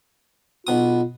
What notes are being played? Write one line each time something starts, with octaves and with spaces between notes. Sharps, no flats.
B1 B2 F4 D#6